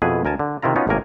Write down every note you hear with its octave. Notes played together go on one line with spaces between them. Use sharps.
F2 B2 E4 G#4 B4 G#5
D2 A#4 G#5 A5
D3
C3 D#3 E4 F4 A#5
B3 C#4 D#4 F4 F#4
G#1 A2 C3 A#3 A#4 G#5